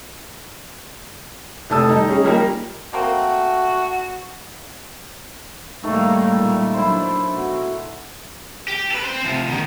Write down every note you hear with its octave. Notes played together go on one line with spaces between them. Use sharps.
F1 A3 A5 D#6 E6
G3 D#4
C#4 G#4
F3 G3 A#3 D#4 G4 A#4
A3 A#3 C4 F#4
A2 D#3 G3 A3 A#3
A#2 G#3
F#3 D4 E4 C5
B2 F#4
G4
A4 B4
C4 C5
C3 F3
B2 D#3